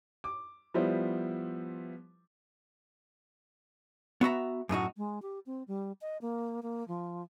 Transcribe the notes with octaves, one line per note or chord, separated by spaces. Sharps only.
D6
F3 G3 B3 E4 C5
B3 F#4 E5 A#5
F#2 A2 D#4 F#4
G#3
G4
C4
G3
D#5
A#3
A#3
F3